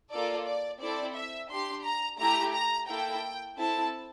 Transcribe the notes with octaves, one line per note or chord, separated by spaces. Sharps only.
A#3 F4 A4 D5
D5
C4 E4 A4 D5
E5
D4 G4 C6
A#5
A3 E4 G4 A#5
A#5
A#3 E4 A4 G5
C4 E4 A4 A5